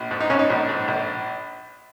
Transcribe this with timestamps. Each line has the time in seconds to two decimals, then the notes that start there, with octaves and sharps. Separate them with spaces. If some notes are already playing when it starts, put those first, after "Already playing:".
Already playing: A#1
0.11 G#2
0.20 D#4
0.30 G#2 C#4
0.39 D#4
0.50 A#1
0.69 G#2
0.88 A#1